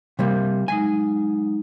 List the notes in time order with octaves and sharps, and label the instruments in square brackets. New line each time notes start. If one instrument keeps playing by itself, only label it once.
[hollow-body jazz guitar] C3 G3 A#3
[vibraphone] F#3 G#3 D#4 [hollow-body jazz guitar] G#5